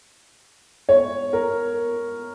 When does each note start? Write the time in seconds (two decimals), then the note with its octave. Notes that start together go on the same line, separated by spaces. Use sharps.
0.89 C#5
1.33 A#4